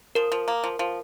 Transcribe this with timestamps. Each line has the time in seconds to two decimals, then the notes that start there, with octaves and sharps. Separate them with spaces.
0.15 F3 A#4
0.32 F3
0.48 A#3
0.64 F3
0.79 F3